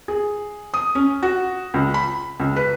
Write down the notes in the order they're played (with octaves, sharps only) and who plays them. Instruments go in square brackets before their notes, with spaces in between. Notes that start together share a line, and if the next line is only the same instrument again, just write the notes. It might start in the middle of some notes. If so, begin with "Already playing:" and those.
[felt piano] G#4
D#6
C#4
F#4
C#2
B5
C#2
B4